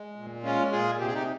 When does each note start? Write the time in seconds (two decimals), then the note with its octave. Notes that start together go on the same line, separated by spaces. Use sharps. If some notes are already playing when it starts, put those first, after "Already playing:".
Already playing: G#3
0.16 A#2
0.43 G#3 C#4 F4
0.71 A#2 F4 G#4
0.99 C3 G4
1.06 G#4
1.14 D#4 G4